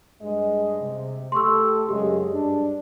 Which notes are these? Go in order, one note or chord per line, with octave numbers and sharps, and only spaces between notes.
G2 G#3 D#5
C3
A3 G4 A4 C6 C#6 E6
F#2 C#3 G#3 G4
G2 D4